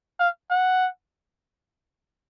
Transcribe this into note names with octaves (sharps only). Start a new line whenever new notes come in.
F5
F#5